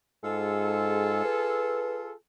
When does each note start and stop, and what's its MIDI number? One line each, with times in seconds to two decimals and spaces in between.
0.24 1.20 44
0.24 2.13 65
0.24 2.13 68
0.24 2.13 69
1.25 2.11 71